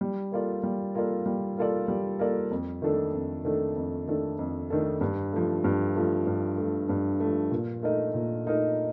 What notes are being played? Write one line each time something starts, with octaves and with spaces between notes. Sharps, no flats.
G3
A#3 F4 A4 D5
G3
A#3 F4 A4 D5
G3
A#3 F4 A4 D5
G3
A#3 F4 A4 D5
F2
D#3 A3 D4 A4
F2
D#3 A3 D4 A4
F2
D#3 A3 D4 A4
F2
D#3 A3 D4 A4
G2
F3 A3
G2
F3 A3
G2
F3 A3
G2
F3 A3
A#2
A3 D#4 A#4 D#5
A#2
A3 D#4 A#4 D#5